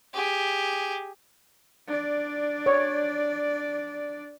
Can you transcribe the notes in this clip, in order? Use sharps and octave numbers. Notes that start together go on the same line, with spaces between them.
G4 G#4
D4 D5
C#5